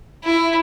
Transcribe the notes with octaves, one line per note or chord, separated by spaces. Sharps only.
E4